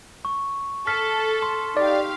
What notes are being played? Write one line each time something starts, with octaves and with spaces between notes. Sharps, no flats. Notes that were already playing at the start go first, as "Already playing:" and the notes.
C#6
A4 F6 B6
C6
D#4 G4 D5 F5